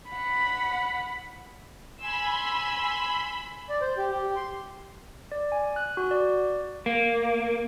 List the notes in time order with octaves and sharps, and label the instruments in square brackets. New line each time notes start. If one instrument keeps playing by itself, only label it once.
[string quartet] F#5 B5
[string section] G#5 C6 E6 [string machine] B5
[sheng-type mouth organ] D5
C5
G4
G4
C6
[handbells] D5
G#5
F#6
F#4
D5
[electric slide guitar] A#3